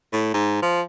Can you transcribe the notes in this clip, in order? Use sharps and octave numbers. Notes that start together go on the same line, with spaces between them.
A2
G#2
F3